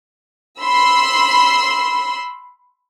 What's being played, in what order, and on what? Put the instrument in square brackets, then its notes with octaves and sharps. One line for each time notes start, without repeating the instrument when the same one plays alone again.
[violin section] B5 C6 E6